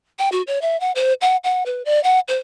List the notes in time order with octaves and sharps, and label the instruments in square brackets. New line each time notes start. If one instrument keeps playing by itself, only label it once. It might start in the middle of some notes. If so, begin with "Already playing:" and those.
[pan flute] G5
F#4
C#5
E5
F#5
C5
F#5
F#5
B4
D5
F#5
C5